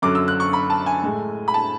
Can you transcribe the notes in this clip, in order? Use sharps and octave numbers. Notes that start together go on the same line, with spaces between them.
F#2 D3 F#3 D6
E6
F#6
C#6
B5
A5
G#5
A2 G#3
B5
A5